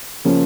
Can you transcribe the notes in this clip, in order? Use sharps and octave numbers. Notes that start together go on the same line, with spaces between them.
C#3 F3 A#3 C#4